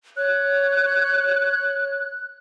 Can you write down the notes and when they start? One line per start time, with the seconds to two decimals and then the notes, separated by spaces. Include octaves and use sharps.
0.17 C#5 F#6